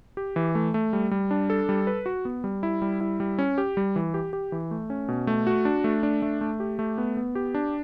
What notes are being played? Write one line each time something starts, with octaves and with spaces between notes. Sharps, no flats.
G4
E3
A3
A3
G3
G3
D4
A4
G3
B4
F#4
B3
G3
E4
G3
E4
G3
C#4
G4
G3
E3
G4
G4
E3
A3
C#4
B2
A3
F#4
D4
A3
D4
A3
A3
G4
A3
B3
B3
G4
D4